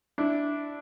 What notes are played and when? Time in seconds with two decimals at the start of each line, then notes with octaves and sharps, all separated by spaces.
0.18 D4 E4